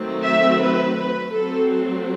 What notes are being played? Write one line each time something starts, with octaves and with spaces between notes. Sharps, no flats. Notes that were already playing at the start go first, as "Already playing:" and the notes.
Already playing: D#3 F#3 A3 C4
E5
B4
B4
F#3 A3 C4 A4
A4